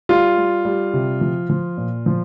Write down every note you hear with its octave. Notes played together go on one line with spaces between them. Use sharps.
G3 F4
G3
G3
C3
F3
F3
A#2
F3